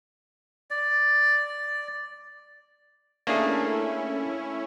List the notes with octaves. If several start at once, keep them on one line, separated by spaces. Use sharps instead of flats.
D5
A3 A#3 C#4 D4 E4 G#4